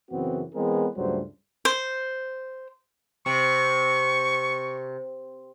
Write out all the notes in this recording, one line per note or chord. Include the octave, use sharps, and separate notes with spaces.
F#2 C#3 E3 B3 C4 F#4
E3 G#3 B3 C4 G#4 A#4
C#2 G2 F#3 G3 A3 C5
C5
C3 C#6